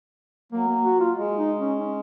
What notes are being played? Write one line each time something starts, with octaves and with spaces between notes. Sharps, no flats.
F#3 A#3
A#3
F#4
F4
G#3
D#4
C#4
C#4